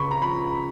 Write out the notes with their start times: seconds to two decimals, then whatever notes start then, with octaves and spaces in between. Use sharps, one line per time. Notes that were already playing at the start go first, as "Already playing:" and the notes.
Already playing: C#2 C#3 B5 C#6
0.11 A#5
0.22 F3 B5